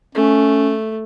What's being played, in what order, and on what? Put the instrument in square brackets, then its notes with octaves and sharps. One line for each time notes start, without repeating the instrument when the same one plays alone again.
[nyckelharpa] A3 [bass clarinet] C#4